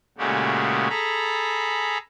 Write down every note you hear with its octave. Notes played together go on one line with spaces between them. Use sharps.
A#2 C#3 G#3 A3 F#4 G4
G#4 A4 A#5 B5